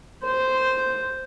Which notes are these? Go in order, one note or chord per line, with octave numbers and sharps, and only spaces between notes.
C5